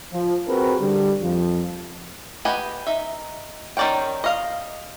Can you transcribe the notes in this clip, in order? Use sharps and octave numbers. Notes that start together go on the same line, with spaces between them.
F3
C4 F#4 G#4 A#4 B4
D3 G3
F2 F3
G4 B4 D#5 F#5 G#5
D#4 E5
D#3 C#4 D5 F#5 G5
D#5 F5